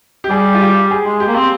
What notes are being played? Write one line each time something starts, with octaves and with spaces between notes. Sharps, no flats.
G4
G3 G#4
F4
G4
G#4
G#3
G4
A#3
C4